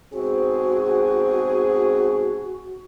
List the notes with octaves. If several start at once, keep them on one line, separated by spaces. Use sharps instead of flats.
G#2 B2 C4 F#4 G#4